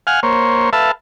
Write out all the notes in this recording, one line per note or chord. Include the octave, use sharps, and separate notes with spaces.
F5 F#5 G#5 F6
A#3 C5 C#5
A4 B4 E5 F5 A5